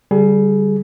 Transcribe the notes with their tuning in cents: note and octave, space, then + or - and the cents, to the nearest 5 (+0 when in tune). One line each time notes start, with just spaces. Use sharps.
D3 -25 G3 +0 G#4 +30